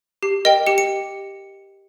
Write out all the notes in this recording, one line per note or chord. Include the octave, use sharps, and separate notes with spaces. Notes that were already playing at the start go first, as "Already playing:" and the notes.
G4 C7
A#4 D#5 G5
G4 C#7
C#7